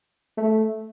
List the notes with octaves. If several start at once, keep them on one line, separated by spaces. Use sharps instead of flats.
A3